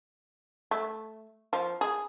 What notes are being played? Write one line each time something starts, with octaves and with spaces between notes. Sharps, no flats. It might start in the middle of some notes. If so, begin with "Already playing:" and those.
A3
F3
G#4